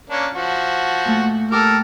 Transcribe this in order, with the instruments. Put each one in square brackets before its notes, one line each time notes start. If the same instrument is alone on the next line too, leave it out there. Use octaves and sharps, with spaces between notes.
[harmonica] A#3 C#4 D4
F3 F#4
[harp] A#2 A3
[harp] G4 D6 [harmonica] A4 A#4